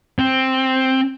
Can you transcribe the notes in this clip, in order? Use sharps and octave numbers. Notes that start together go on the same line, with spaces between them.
C4